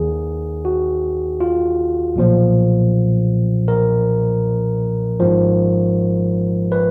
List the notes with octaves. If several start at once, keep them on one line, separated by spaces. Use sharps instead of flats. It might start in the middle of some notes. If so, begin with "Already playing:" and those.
Already playing: D#2 D#3 G#4
F#4
F4
B1 A#2 F3
A#4
G#1 G#2 F3
B4